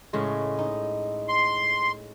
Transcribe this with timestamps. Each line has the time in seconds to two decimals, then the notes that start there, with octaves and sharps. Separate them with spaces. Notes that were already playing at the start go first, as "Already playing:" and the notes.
0.13 A2 C#3 G#3
0.59 D#4
1.28 C6